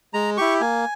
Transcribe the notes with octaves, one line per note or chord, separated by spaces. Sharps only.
G#3 A#5
E4 G4 C#6
A#3 G#5